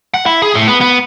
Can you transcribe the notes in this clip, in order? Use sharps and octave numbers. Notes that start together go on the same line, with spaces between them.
F#5
E4
G#4
A2
B3
B3